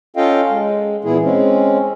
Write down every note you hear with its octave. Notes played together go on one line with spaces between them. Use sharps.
C#4 F4 A4 D#5 F5 G5
G#3
A#2 E3 B3 E4 G#4
G#3 C4 C#4